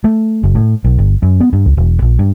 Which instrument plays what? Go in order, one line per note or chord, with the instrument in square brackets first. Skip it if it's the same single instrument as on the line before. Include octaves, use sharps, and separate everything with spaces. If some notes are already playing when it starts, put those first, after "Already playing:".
[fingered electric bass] A3
F#1
A2
B1
G1
F#2
B3
G2
C#2
E1
A#1
G2